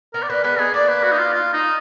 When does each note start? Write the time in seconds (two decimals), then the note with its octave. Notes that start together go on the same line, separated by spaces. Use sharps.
0.14 B3 D#4 A#4
0.23 D5
0.30 A#3 D4 B4
0.44 G#3 B3 B4
0.59 B3 D#4 G#4
0.74 A#3 D4 D5
0.89 B4
1.03 F#4
1.11 D#4
1.18 F4
1.34 F4
1.53 D#4